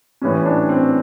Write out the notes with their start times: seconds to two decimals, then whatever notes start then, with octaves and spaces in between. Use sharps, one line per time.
0.22 A2 E3 G3 C#4
0.45 D4
0.69 C4